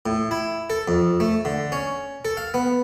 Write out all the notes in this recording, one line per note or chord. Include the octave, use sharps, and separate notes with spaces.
A2
E4
A4
F2
A3
D3
C#4
A4
F5
B3